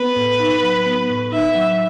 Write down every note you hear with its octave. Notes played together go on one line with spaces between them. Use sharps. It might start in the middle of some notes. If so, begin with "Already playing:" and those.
Already playing: B3 B4
A2
D#4
F#3
B3
A2
D#4 E5
F#3